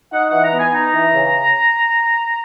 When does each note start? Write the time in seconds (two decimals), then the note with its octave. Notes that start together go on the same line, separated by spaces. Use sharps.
0.12 D#4 F#5
0.27 F#5
0.33 E3
0.43 A#5
0.53 B3
0.58 G#5
0.73 D#4 A#5
0.94 E3
1.14 C#3